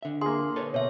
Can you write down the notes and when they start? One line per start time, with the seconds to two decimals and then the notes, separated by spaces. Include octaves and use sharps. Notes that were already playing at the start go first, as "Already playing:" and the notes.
0.03 D3 E5
0.21 A#3 G#4 C6
0.56 A4 B4 C#5
0.74 B2 C#5 E5